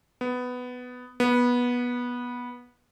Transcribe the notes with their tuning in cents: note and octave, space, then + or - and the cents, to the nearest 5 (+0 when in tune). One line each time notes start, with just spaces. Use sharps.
B3 +10
B3 -15